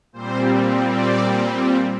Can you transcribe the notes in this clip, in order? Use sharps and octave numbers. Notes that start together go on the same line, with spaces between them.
A#2 G3 C4 C5
D5